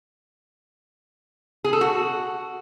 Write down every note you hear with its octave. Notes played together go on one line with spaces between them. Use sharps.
G#4
A4
F#4